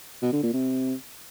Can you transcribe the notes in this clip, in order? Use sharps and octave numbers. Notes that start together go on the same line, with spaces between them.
B2
D3
A#2
C3